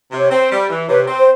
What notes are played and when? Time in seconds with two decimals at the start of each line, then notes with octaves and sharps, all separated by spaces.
0.12 C3
0.18 C#5
0.31 C4 C5
0.51 G3
0.69 E3
0.88 C3 B4 C#5
1.07 C4
1.18 C5